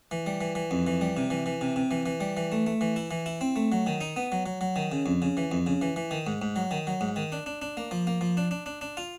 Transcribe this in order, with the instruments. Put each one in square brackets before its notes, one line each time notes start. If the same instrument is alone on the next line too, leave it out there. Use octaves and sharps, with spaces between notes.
[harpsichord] E3
G3
E3
E3
F2
E3
G3
C3
E3
E3
C3
C3
E3
E3
G3
E3
A3
A3
E3
E4
E3
E4
C4
A3
F#3
D#3
D#4
B3
F#3
F#3
F#3
D#3
C#3
F2
C#3
E3
F2
C#3
E3
E3
D#3
G#2
G#2
F#3
D#3
F#3
G#2
D#3
D4
D4
D4
A#3
F3
A#3
F3
D4
D4
D4
D4
F4